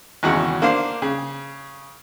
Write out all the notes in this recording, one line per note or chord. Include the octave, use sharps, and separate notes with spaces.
G#1 E2 C#3 F#4
A#3 D4 C5 F5
C#3